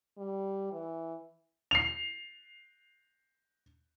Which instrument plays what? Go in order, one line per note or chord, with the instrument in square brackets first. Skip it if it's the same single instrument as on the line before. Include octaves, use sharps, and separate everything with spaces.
[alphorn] G3
E3
[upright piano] C7 F7